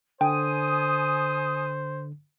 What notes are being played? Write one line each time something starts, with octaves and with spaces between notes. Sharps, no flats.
D3 C5 G5 G#5 D#6